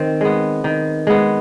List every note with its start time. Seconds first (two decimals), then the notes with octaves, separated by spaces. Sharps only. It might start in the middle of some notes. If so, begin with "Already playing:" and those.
Already playing: D#3 C4
0.21 G#3 B3
0.64 D#3
1.07 G#3 B3